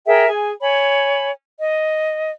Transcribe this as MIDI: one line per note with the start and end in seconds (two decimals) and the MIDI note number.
0.06 0.27 68
0.06 0.27 70
0.06 0.27 76
0.06 0.27 79
0.28 0.51 68
0.28 0.51 80
0.61 1.31 73
0.61 1.31 80
0.61 1.31 83
1.59 2.30 75